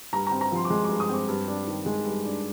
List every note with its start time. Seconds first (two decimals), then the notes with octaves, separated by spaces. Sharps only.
0.13 G2 A#5
0.27 A#5
0.32 C4
0.41 A#5
0.52 F3 C6
0.65 D6
0.70 G#3 C6
0.85 G2 D6
1.00 D#6
1.09 C4 D6
1.28 G2
1.48 D4
1.67 D#3
1.86 G#3
2.05 G2
2.25 D4